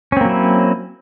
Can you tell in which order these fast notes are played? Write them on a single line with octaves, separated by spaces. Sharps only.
C#4 C4 A#3 F#3 E4